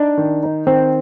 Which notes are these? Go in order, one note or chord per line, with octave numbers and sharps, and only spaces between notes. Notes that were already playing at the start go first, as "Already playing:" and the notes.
Already playing: D4 D#4
D#3
D#4
D#3 C4